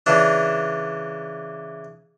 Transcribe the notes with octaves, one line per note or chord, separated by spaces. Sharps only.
C#3 E3 D4